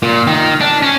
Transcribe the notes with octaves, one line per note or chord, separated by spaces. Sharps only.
A#2
D#3
D4
C#4